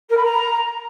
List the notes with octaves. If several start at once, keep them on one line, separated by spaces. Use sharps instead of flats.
A#4
B5
A#5